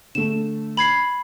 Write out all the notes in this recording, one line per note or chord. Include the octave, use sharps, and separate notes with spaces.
D3 A3 E7
B5 G#6 C7